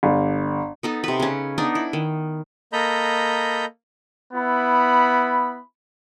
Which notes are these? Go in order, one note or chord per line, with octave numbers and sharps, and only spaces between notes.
G1
B3 D#4 A4
C3 B4
C#3 C#4
B3 D4 D#4
E4
D#3
A#3 A4 D#5 A#5 B5 G6
B3 E4 B5